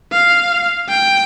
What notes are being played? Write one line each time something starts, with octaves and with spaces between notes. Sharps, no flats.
F5
G5